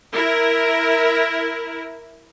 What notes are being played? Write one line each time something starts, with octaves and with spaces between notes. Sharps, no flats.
E4 A#4